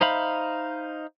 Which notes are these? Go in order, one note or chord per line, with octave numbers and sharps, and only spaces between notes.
D#4 C5 E5 F5 B5